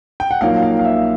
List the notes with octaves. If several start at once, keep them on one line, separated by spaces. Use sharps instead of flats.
G5
F#5
A#1 A#2 F#3 A#3 D#4 F5
F5
F5
E5